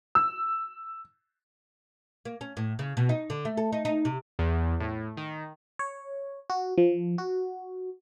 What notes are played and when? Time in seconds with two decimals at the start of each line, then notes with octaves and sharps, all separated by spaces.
0.15 E6
2.25 A#3
2.41 C#4
2.57 A2
2.79 C#3
2.97 B2
3.09 D#4
3.30 D3
3.45 A3
3.57 A4
3.72 D#4
3.85 D#4
4.05 C3
4.39 E2
4.80 A2
5.17 D#3
5.79 C#5
6.50 F#4
6.78 F3
7.18 F#4